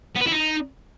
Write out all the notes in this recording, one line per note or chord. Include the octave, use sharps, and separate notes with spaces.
B3
B4
E4
D#4